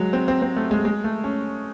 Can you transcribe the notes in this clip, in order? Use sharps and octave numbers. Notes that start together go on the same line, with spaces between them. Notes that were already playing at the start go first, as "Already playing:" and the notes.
Already playing: F#3 G#3
C4
C4
C4
A3
G#3
G#3
A3
C#4